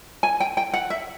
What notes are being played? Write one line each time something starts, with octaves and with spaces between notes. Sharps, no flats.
G#5
G5
G5
F#5
E5